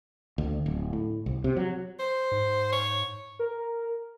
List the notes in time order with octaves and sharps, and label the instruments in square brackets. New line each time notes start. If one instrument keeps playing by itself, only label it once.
[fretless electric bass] D2
D1
A2
C2
C3
F#3
[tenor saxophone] C5
[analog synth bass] G#2
[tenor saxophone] C#5
[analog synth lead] A#4